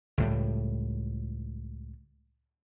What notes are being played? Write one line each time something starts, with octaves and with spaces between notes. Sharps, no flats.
C#2 A2 G3